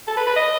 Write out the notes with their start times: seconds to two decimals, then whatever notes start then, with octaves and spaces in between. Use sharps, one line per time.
0.07 A4
0.17 B4
0.27 B4
0.36 D#5